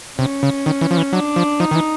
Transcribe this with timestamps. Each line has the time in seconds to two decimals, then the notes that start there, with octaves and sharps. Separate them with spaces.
0.19 C3 C#4
0.43 C#3
0.66 D#3
0.81 E3
0.91 F3
0.97 E3
1.13 F#3 D4
1.36 F3
1.60 F3 D#4
1.71 D#3
1.75 E3